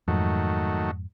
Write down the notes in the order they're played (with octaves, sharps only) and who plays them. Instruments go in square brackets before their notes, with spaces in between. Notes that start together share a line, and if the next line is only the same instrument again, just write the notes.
[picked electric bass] F2 G#2 [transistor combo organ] D#3 F#3 A3